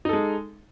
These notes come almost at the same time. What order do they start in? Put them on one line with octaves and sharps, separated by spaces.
D#4 A4 G#3